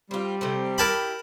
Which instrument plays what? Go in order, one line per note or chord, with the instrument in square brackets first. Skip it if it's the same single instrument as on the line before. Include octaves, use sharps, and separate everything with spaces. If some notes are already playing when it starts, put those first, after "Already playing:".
[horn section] G3 [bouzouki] C4 F4
[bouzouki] C3 A3 C4
[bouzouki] E4 G4 G5 [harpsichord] A#4 A5 B5